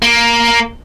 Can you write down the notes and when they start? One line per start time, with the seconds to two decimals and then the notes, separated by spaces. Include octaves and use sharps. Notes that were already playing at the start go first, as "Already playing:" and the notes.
0.02 A#3